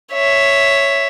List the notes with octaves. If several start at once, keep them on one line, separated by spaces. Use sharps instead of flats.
C#5 E5